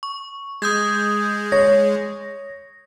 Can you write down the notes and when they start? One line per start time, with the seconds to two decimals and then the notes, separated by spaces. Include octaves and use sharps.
0.03 C#6
0.62 G#3 D#6 G6 G#6
1.52 C#5 A#6